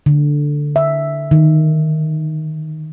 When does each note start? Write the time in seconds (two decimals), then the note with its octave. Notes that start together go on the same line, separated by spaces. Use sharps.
0.06 D3
0.76 E5
1.31 D#3